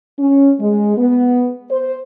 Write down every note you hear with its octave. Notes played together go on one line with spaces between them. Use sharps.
C#4
G#3
B3
C5